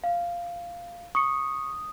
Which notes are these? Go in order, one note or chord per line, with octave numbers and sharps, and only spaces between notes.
F5
C#6 D#6 C#7